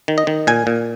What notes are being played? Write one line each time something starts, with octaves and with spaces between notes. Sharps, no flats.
D#3
D#5
D#3
A#2 G#5
A#2